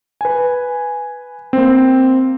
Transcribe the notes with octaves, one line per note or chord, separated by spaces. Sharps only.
B4 G#5
A#3 C4